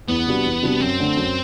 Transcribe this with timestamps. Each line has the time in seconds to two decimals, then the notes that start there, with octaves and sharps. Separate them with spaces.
0.08 E2 B3
0.26 C3 G3 D4 F#4
0.45 E2
0.62 C3 G3 D4 F#4
0.80 F#2 C4
0.99 D3 A3 D4
1.16 F#2